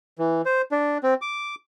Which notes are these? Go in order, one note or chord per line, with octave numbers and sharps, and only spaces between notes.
E3
C5
D4
C4
D6